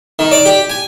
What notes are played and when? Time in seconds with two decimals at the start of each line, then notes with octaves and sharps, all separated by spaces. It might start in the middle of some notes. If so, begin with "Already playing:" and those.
0.19 D#3
0.31 D5
0.46 G4
0.70 G#5